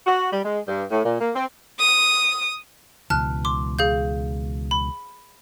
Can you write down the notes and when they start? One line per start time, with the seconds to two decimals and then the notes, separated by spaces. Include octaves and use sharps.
0.07 F#4
0.33 G3
0.45 G#3
0.68 G2
0.90 A2
1.05 A#2
1.20 A#3
1.35 C4
1.78 D#6
3.10 C#2 B2 E3 A5 F6 F#6
3.45 C6 D6
3.79 G#4 F5 G6
4.71 B5